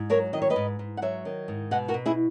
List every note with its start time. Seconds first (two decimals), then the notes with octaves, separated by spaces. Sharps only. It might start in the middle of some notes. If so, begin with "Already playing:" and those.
Already playing: G#2
0.10 F#3 A#4 C#5
0.33 D#3 D#5
0.42 C#5
0.50 B4 D#5
0.56 G#2
0.79 G#2
0.97 F#5
1.02 F#3 C#5 E5
1.25 D#3
1.48 G#2
1.71 B2 D#5 F#5
1.88 F#4 A#4
1.94 B2
2.06 E4 G#4